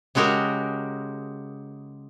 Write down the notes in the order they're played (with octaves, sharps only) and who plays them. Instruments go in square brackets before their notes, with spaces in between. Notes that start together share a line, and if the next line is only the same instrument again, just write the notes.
[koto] C#3 G#3 F#4 G4 A#4